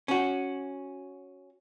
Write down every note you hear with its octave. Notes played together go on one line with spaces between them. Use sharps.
C#4 F#4